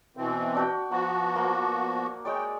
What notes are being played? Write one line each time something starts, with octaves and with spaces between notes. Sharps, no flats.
B2 E3 C4
D4 F#4 G5
F3 B3 F#4 F#5 A#5
A#3 F#5
G#3 C#5 D5 G5